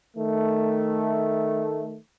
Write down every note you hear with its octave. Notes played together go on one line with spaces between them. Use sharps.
D#3 A3